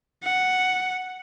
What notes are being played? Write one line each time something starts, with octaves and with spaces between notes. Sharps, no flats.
F#5